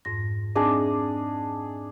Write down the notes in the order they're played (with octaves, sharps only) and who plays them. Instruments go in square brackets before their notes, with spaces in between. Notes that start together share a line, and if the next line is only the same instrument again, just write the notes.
[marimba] F2 G#2 A#6
[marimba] C4 D#4 [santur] D4 G#4 D#5